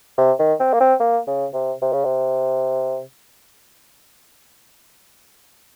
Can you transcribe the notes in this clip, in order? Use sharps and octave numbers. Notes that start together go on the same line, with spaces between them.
C3
D#3
C4
A#3
C4
A#3
C#3
C3
C3
C#3
C3